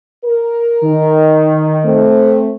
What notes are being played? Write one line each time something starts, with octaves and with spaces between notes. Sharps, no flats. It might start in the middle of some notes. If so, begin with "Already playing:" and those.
A#4
D#3
A3 C4